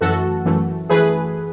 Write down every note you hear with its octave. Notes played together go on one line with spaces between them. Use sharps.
F#2 E3 A3 F#4 A4
F#2 E3 A3
E3 A3 G#4 B4